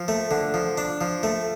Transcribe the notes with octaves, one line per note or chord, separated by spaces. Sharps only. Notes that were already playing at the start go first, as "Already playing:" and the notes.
Already playing: F3
A3
D3
F3
D4
F3
A3